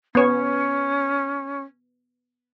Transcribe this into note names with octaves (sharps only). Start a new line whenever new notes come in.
B3 C#4 C#5